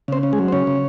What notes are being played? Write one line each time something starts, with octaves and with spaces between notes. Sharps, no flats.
C#3 C4 C5
C#4
G#3 G#4
F#3
C5
C#3 C#4 C#5
C#3